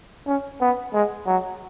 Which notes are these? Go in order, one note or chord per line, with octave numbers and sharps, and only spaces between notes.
C#4
B3
G#3
F#3